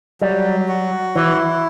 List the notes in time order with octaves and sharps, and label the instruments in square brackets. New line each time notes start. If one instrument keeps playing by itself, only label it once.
[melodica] F#3 [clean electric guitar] G3
[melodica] F#4
[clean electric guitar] E3 [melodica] E4